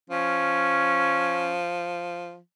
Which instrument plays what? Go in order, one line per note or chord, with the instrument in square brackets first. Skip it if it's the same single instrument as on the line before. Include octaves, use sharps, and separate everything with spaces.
[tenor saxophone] F3 [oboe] C#4